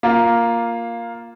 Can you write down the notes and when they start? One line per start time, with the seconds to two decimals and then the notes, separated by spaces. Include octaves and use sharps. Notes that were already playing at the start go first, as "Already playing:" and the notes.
0.03 A#3 F4